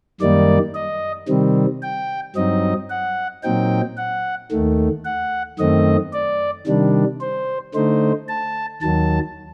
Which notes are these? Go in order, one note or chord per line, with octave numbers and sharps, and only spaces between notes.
F#2 D#3 G3 A#3 D#4 D5
D#5
C3 D#3 G3 C4
G5
G2 F#3 C4 D#4 D#5
F#5
A#2 F#3 C4 D#4 G5
F#5
D#2 D#3 A3
F#5
F#2 D#3 A3 C4 D#5
D5
C3 D#3 G3 D4
C5
D3 A3 D#4 C5
A5
D#2 D#3 F#3 A5